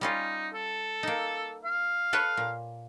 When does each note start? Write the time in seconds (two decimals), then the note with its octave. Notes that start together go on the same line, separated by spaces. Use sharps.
0.01 G3 C#4 D#4 F4
0.54 A4
1.03 A#3 D#4
1.65 F5
2.13 A4 B4 C#5
2.37 A#2